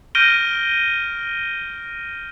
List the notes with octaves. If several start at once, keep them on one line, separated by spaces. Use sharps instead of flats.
F6 G6 A#6 D7 D#7 G7